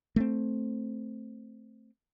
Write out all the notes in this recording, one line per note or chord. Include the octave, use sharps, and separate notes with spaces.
A3 A#3 C4